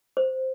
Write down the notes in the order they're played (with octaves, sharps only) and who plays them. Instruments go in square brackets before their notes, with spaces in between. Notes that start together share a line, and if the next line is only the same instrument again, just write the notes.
[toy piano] C5